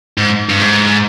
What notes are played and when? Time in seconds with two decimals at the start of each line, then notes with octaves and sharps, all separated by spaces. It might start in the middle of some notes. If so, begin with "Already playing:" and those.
0.18 G#2
0.49 G2
0.60 G#2